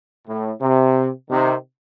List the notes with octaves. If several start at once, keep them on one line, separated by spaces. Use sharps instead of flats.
A2
C3
C3 D#3